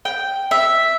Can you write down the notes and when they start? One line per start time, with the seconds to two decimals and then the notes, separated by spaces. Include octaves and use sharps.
0.05 G5
0.51 E5